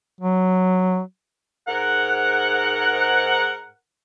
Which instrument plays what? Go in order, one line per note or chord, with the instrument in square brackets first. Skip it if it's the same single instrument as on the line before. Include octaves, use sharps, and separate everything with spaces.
[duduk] F#3
[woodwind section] G#2 A#4 F#5